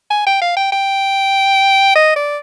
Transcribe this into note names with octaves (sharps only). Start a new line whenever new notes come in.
G#5
G5
F5
G5
G5
D#5
D5